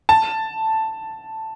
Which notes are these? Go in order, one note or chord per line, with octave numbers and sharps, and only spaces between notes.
A5